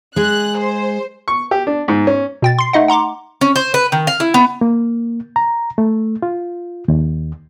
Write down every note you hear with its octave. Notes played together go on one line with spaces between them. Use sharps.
G#3 G#4 F#6
C5
C#6
G4
D4
G#2
C#4
B2 G5 A6
C6 C7
A3 D#4 D#5 F#5
F#5 A#5 C6 D6
C#4
C5
B4
D#3
F5
E4
B3
A#3
A#5
A3
F4
D#2